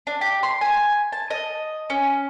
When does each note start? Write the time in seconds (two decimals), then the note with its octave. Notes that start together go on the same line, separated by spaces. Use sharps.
0.07 D4
0.21 G4
0.43 C6
0.61 G#5
1.12 A5
1.30 D#5
1.90 C#4